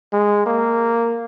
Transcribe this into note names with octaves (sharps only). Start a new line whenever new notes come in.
G#3
A#3